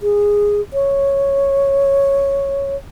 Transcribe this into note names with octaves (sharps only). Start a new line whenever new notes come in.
G#4
C#5